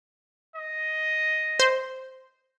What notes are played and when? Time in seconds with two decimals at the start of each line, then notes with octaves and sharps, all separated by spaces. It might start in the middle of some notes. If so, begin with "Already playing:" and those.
0.56 D#5
1.60 C5